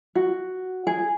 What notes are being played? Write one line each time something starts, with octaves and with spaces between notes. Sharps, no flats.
F#4
G#4